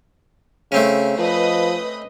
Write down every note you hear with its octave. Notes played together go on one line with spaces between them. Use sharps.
C#3 A3 C4 C#4
F3 B4 D#5 D#6